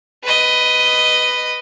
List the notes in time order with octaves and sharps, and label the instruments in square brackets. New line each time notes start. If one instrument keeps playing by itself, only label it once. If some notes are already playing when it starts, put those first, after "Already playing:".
[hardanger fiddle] B4 D#5